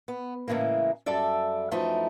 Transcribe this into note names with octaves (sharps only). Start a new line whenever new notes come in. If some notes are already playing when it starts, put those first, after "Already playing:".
B3
A2 C#3 E3 G#3 A#3
F#2 G3 A4 D5 E5
F#2 E3 F3 A3 D#4